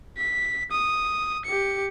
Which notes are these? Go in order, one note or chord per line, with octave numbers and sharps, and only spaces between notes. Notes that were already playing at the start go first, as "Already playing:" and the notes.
B6
D#6
G4 C#7